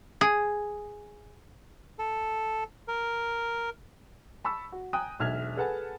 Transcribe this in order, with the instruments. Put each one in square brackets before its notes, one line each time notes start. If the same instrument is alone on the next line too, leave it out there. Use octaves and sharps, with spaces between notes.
[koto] G#4
[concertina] A4
A#4
[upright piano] A5 B5 C#6 E6
F#4
G5 G#5 A#5 D#6 F#6
E1 B1 E5 F6 G#6 F7
G#4 A4 B4 F#5 G#5 A5